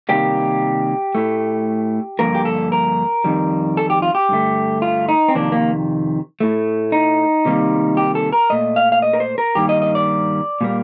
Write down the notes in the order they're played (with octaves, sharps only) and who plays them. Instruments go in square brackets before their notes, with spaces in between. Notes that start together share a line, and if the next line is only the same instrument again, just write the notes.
[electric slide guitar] C3 D#3 G3 A#3 G4
A2 A3
G2 D3 F3 A#3 A#4
G4
A4
A#4
F2 D#3 G3
A4
G4
F4
G4
G2 D3 A3
F4
D#4
C4
F2 C3 D#3 A#3 D4
A#3
A2 A3
D#4
C3 D#3 G3 A#3
G4
A4
A#4
A#2 A3 D#5
F5
F5
D#5
A#4
C5
A#4
G2 D#3 G3 A#3 G4
D#5
D#5
D5
A#2 G3 A#3